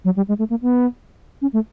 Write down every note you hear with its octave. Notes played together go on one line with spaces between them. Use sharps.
F#3
G3
G#3
A3
A#3
B3
C#4
A3